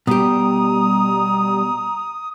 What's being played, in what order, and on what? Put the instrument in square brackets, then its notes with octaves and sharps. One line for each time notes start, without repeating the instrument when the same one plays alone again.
[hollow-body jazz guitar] B2 G4 [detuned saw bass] G3 [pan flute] A#5 [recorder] D#6